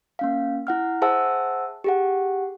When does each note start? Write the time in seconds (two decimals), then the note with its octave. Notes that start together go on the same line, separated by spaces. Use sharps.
0.19 A#3 C#4 F5
0.67 E4 F#5 F6
1.02 G#4 C5 E5 F#5 A5 E6
1.84 G4 G#4 F#5